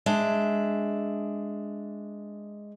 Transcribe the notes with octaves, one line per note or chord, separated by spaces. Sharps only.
G#3 D4 E5